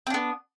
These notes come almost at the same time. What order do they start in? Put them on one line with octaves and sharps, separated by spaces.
C4 D4 B3